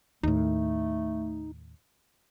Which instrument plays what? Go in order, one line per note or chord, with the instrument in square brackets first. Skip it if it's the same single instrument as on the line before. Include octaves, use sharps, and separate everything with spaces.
[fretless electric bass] D#2 A2 [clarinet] A3 [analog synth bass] D#4